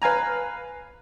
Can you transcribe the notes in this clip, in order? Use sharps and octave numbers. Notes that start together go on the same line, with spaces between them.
B4 F5 G#5 A#5